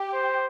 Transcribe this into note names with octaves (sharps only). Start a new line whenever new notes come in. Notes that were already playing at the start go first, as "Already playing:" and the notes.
Already playing: G4
C5